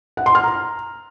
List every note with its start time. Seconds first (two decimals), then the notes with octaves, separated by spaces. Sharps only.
0.17 F#5
0.26 C6
0.35 F6
0.44 A#5